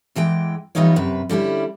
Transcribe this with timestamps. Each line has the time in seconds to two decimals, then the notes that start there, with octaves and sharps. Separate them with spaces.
0.16 E2 E3 G#3 G5
0.75 E3 G3 B3 D#4 F4 C#5
0.96 F#2 C3 B4
1.29 D3 G3 C#4 E4